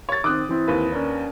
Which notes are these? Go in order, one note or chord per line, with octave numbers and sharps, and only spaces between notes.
C#5 A6
D#3 C4 D6 D#6 F#6
E3 C4 E4
D#2 B4
C#4 D4 A#4